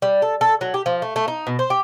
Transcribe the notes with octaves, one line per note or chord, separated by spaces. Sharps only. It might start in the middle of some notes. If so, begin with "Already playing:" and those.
G3
A4
A4
F#3
G4
F3
A3
A3
D#4
B2
C5
G4